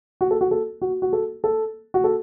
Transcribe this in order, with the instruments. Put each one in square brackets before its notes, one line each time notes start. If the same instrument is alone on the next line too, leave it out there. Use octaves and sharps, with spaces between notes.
[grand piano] F#4
A4
F#4
A4
F#4
F#4
A4
A4
F#4
A4